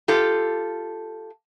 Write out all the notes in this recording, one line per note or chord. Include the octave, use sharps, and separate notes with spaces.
F4 G4 A4